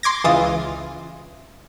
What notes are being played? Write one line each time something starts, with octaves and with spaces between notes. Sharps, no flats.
C6 D6 G#6 A#6
C#2 E3 F4 D#6 A6